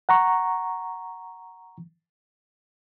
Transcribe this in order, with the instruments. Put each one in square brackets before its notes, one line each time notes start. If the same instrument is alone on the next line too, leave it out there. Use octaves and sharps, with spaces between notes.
[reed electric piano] F#5 A#5 C#6